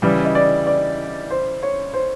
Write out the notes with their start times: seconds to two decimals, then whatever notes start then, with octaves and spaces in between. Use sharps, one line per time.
0.02 C#3 E3 G3 D5
0.25 D#5
0.35 D5
0.67 D5
1.31 C5
1.63 C#5
1.94 C5